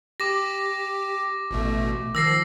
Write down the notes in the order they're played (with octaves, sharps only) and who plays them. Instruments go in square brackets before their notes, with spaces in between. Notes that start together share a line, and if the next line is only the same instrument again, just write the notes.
[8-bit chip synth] G4 [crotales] D6 A#6
[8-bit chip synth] A1 B2 A3
[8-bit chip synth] D#3 F3 [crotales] E6 A#6 C7